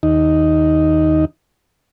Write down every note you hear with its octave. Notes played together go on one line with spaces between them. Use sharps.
D#2 D#4